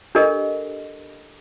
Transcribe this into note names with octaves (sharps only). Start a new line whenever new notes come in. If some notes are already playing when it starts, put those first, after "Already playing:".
D4 G4 A4 A#4 D#5